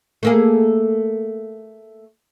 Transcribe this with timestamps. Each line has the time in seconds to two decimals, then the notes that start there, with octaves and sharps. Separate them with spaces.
0.23 A3 A#3 G#4